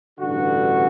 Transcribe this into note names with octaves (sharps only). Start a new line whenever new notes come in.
A1 G2 D3 F#4